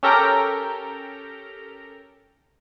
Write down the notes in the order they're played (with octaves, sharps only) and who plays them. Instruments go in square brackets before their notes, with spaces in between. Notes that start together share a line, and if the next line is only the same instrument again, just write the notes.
[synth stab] C#4 G4 A4 A#4 G5 A#5